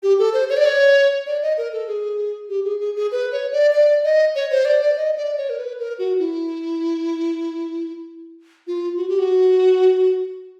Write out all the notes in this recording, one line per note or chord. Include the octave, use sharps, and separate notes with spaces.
G4
A4
C5
C#5
D5
C#5
D5
D#5
A#4
A4
G#4
G4
G#4
G#4
G#4
B4
C#5
D5
D5
D#5
C#5
C5
D5
D5
D#5
D5
C#5
A#4
B4
A#4
F#4
E4
F4
F#4
G4
F#4